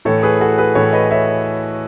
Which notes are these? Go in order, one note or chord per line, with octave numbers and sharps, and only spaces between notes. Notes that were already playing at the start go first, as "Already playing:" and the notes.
A2 E3 A4 C#5
G#4 B4
F#4 A4
G#4 B4
A2 E3 A4 C#5
B4 D#5
C#5 E5